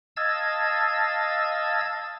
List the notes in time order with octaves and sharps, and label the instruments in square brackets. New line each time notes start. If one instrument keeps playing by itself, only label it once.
[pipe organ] D#5 F5 A5 E6 G#6 A6